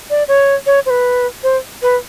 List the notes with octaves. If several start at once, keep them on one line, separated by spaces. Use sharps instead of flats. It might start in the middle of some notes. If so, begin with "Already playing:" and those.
D5
C#5
C#5
C5
B4
C5
B4